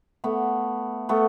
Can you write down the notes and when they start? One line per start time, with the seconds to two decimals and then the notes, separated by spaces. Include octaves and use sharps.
0.24 A3 B3
1.09 A3 B3